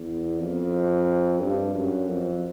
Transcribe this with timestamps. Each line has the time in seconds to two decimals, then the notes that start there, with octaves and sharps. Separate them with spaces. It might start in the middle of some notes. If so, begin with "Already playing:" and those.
Already playing: E2
0.40 F2
1.42 G2
1.75 F#2
2.09 F2